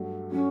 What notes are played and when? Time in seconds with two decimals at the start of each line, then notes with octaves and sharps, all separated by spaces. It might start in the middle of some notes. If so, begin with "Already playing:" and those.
Already playing: G2 F#3 A3
0.31 F#3 A3 C#4